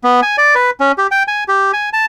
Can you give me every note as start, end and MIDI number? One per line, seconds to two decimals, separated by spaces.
0.04 0.21 59
0.22 0.37 80
0.38 0.55 74
0.55 0.71 71
0.80 0.92 61
0.98 1.07 67
1.11 1.23 79
1.28 1.44 80
1.48 1.72 67
1.73 1.90 80
1.93 2.06 81